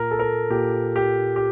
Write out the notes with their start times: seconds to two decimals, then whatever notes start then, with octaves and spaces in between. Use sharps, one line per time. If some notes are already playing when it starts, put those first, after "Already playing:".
Already playing: A#2 A#4
0.11 A4
0.19 A#4
0.50 A#2 G4
0.96 G4
1.36 G4